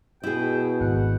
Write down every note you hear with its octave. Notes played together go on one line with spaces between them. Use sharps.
B2 E4 G#4 G5
G#1 F#5